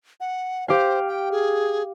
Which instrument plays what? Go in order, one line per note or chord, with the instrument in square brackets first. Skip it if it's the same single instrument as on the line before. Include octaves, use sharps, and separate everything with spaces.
[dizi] F#5
[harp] G4 F5 [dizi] C5
[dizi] G5
G#4